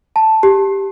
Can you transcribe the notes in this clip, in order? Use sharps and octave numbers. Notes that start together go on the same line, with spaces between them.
A5
G4